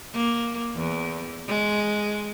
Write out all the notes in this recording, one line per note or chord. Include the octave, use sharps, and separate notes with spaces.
A#3
E2
G#3